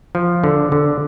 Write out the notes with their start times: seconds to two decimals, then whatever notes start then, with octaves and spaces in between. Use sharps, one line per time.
0.15 F3
0.44 D3
0.72 D3